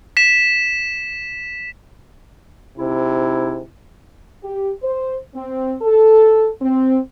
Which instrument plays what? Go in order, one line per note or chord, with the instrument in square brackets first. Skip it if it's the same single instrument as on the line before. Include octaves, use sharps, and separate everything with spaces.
[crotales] B6 E7
[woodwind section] G#2 D#4 E4 [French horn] C3
[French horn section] G4
C5
C4
A4
C4